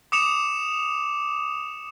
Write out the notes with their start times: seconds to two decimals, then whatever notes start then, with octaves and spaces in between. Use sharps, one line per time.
0.12 D6 D#6 C#7 E7 F7